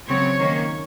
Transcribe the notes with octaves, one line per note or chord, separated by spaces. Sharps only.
C#3 F#3 C4 C#5
D#3 A#3 C#4